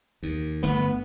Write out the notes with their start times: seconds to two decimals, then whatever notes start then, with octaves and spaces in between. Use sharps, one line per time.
0.23 D#2
0.63 G1 G2 A3 B3